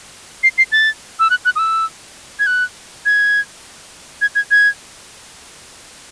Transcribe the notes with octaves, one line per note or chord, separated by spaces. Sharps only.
C7
C7
A6
E6
F#6
F#6
D#6
E6
G#6
F#6
G#6
G#6
G#6
G#6